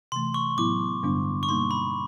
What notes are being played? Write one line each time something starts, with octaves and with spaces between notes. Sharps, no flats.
C3 E3 A3 C6
C#6
A2 F#3 B3 E4 D6
G2 D3 G3 B3 D4
C#6
B2 G3 A#3 D#4 C6
B5